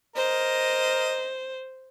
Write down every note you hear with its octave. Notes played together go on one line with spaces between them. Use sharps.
A#4 C5 D#5